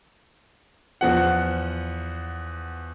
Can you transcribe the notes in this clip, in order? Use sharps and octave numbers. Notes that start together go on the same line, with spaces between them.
E2 F3 F#5